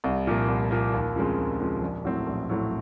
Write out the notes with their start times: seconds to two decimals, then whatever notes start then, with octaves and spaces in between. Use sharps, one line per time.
0.04 C2
0.27 A#2 F3 A#3
0.48 C2
0.71 A#2 F3 A#3
0.93 D#2
1.16 C#3 F3 G#3 C4
1.38 D#2
1.60 C#3 F3 G#3 C4
1.82 A#1
2.04 A2 F#3 A3 C4
2.27 A#1
2.49 A2 F#3 A3 C4